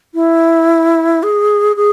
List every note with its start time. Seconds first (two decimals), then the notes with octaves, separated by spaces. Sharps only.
0.15 E4
1.23 G#4
1.76 G#4